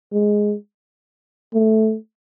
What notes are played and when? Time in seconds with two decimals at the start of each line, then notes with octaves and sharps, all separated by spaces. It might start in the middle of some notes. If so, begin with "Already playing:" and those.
0.13 G#3
1.54 A3